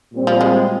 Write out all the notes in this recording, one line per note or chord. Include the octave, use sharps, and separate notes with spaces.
A#2 G3 C4
F3
G#3